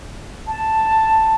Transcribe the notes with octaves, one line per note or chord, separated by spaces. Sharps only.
A5